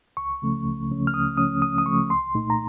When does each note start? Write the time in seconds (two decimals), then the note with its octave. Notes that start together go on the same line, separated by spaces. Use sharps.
0.17 C#2 C#6
0.42 C#3 F3 A3 C#4
0.65 C#2
0.90 C#3 F3 A3 C#4
1.07 F6
1.14 C#2 D#6
1.38 C#3 F3 A3 C#4 D#6
1.62 C#2 D#6
1.78 D#6
1.86 C#3 F3 A3 C#4 C#6
2.10 C2 C6
2.35 A#2 A3 D#4
2.50 A#5